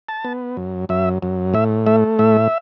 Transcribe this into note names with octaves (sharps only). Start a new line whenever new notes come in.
A5
B3
F#2
F#2 E5
F#2
A2 E5
A3 E5
A2 E5